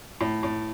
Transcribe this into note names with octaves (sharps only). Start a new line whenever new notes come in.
A2
A2